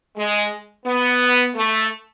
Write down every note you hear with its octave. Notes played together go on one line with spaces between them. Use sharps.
G#3
B3
A3